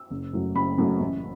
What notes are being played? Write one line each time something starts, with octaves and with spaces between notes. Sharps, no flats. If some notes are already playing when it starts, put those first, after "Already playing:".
Already playing: E6
F#1
F#2 F#3 A3
F#1 B5
F#2 F#3 A3
A1